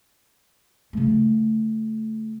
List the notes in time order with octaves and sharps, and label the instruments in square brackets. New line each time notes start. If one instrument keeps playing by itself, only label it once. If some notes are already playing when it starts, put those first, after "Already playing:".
[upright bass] C#3 A3